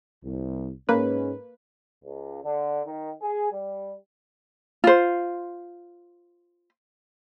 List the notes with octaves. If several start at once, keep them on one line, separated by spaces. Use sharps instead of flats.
C2
G#2 G#3 A#3 C#4 B4
C#2
D3
D#3
G#4
G3
F4 C5